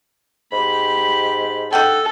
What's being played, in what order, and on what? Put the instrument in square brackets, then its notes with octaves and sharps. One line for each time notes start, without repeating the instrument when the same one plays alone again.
[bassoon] G#2 [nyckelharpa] G4 B5
[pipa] D#4 F#5 G5 [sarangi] A4